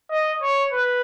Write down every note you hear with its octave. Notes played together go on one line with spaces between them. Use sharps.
D#5
C#5
B4